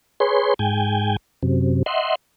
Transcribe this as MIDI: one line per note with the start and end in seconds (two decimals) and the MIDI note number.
0.20 0.54 68
0.20 0.54 71
0.20 0.54 73
0.20 0.54 84
0.59 1.16 44
0.59 1.16 79
0.59 1.16 80
1.43 1.83 42
1.43 1.83 48
1.86 2.15 75
1.86 2.15 76
1.86 2.15 78
1.86 2.15 84